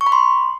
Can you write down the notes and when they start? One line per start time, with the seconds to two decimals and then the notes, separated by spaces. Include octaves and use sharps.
0.01 C#6
0.06 B5
0.12 C6